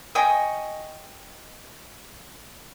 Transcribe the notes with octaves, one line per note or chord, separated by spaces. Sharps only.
D#5 G5 G#5 C#6